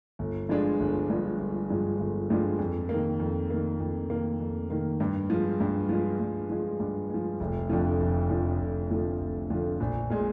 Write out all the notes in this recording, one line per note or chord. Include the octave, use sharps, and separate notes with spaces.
G1
G2 F3 G#3 D4
G1
G2 F3 G#3 D4
G1
G2 F3 G#3 D4
G1
G2 F3 G#3 D4
F2
D#3 A#3
F2
D#3 A#3
F2
D#3 A#3
F2
D#3 A#3
G2
F3 G#3
G2
F3 G#3
G2
F3 G#3
G2
F3 G#3
F1
F2 D3 F3
F1
F2 D3 F3
F1
F2 D3 F3
F1
F2 D3 F3
A#1
A#2 G#3